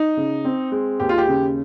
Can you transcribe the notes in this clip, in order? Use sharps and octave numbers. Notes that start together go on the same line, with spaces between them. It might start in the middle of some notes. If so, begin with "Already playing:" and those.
Already playing: D#4
C#3
C4
G#3
D#2 G4
F4
G4
C#3